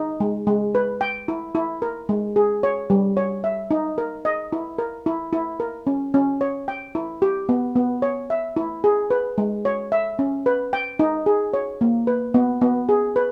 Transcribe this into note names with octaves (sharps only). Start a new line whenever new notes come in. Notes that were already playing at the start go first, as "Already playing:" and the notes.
Already playing: D#4
G#3
G#3
B4
G5
E4
E4
A#4
G#3
G#4
C#5
G3
C#5
E5
D#4
A#4
D#5
E4
A#4
E4
E4
A#4
C#4
C#4
C#5
G5
E4
G4
B3
B3
C#5
E5
E4
G#4
B4
G#3
C#5
E5
C#4
B4
G5
D#4
G#4
C#5
A#3
B4
B3
B3
G#4
B4